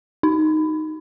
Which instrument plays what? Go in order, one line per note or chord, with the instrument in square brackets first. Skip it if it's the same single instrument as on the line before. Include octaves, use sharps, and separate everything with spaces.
[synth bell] D#4